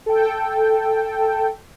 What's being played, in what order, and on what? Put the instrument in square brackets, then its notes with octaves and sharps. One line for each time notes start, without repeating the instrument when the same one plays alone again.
[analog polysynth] A4 G5